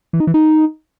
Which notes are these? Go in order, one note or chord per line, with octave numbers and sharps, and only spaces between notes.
E3
D#4
E3
D#4